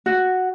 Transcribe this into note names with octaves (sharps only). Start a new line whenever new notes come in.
F#4